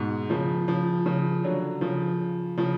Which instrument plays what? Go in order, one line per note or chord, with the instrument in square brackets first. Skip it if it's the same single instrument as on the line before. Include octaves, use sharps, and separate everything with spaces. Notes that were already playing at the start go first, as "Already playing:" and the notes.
Already playing: [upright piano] G#2 B2
C#3 F3
C#3 F3
C#3 F3
D3 F#3
C#3 F3
C#3 F3